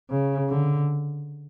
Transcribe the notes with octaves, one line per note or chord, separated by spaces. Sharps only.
C#3
D3